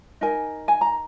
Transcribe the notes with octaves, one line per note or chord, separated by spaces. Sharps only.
D#4 A#4 G#5
G#5
A#5